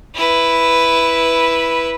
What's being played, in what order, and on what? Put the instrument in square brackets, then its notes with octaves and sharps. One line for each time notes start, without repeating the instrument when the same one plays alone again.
[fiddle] E4 B4